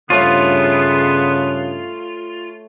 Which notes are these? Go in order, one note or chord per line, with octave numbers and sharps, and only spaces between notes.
G2 C#3 A3 B3 F4 C#5 F5